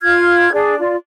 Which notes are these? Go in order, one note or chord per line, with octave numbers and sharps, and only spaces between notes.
F4 F6 G#6
D4 G#4 D5
F4 D5